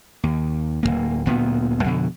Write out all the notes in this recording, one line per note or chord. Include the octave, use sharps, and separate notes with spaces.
D#2
D1 D#2 A#3
D1 D2 A#2 B3
F2 B2 D3